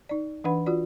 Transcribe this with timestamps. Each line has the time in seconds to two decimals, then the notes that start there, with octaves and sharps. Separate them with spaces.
0.09 D#4 D5
0.44 E3 D4 B4 F#5 B5
0.66 F4 F#4 D5